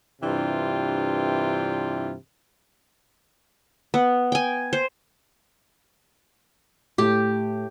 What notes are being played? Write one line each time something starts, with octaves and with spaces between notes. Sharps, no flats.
G2 C3 E3 D4 F4 G5
B3
G5 G#5
C5
A2 G4